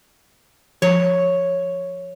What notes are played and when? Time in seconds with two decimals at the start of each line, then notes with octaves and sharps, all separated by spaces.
0.82 F3 C#5